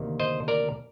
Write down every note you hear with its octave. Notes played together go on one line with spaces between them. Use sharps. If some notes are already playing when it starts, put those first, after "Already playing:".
Already playing: D2 C3 D#3 A#3
C5 D#5
A#4 D5